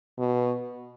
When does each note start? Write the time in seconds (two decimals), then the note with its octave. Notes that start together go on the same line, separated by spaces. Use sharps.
0.18 B2